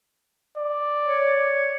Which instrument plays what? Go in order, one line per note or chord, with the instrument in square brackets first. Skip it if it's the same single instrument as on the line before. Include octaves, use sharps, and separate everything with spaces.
[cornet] D5
[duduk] C#5